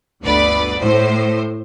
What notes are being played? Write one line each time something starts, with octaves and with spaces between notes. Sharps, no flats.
G1 D2 B4 D5 B5
A2 C5